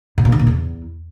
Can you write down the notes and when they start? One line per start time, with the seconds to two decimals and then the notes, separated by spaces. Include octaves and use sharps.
0.18 A2
0.25 A#2
0.32 D#3
0.39 A#2
0.47 E2